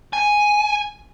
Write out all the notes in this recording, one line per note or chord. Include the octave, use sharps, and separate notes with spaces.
G#5